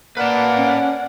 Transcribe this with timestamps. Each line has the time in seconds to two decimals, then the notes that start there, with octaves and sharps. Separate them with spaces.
0.17 A#3 B4 D5 F5 F#5 A5
0.58 C#4